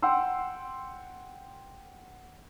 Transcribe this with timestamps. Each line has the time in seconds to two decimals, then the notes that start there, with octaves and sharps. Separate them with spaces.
0.02 F#5 G5 C6 E6